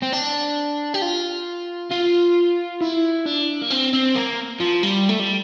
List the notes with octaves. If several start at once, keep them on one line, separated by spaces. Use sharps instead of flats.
C4
D4
G4
F4
F4
E4
D4
A#3
C4
C4
A#3
F3
G3
A3
G3